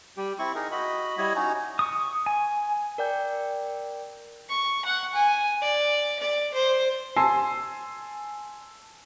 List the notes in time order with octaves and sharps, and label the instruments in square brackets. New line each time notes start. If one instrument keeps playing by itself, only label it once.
[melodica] G3 G4
C4 E4 C#6
D#4 G#4 A#4
F#4 D#5 B5
G3 E4 C#5 D#5
C#4 D#4 F#4 A#5
[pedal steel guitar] C#6 D#6
G#5
[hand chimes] A#4 D5 G5 G6
[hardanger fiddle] C#6
F#5
G#5
D5
D5
C5
[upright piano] G#5 A5 C6 E6 C7